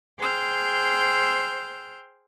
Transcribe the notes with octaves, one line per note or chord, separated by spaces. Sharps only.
G#4 C5 G5 E6 F6 G6